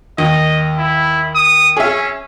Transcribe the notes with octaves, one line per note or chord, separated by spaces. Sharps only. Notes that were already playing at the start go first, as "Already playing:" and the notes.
D#2 D#5
E4
D#6
C#4 G#4 E5